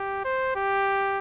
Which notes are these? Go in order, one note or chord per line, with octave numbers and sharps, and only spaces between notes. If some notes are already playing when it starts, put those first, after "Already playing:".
Already playing: G4
C5
G4